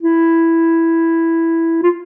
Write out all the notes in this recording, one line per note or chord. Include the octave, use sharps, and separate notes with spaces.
E4
F4